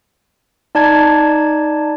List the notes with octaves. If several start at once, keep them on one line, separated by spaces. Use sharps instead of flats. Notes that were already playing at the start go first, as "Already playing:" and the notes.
D#4 D5 A5 G#6